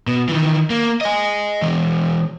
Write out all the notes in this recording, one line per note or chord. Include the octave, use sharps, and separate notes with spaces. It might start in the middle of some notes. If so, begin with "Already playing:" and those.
B2
D#3 E3
A#3
D#5 G#5
E3 G#3